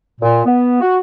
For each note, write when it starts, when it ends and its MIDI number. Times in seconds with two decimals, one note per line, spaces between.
0.20 0.41 46
0.45 0.81 59
0.81 0.98 66